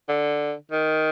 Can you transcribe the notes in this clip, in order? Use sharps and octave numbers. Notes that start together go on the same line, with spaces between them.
D3
D#3